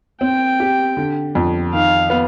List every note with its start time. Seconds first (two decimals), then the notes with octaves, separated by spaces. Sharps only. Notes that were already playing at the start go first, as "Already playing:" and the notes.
0.21 C4 G5
0.60 G4
0.97 D3
1.35 F2
1.73 D#3 F5
2.10 B3